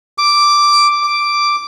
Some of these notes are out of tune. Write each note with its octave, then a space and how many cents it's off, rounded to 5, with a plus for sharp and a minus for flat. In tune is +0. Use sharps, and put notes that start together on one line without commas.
D6 +0
D6 +0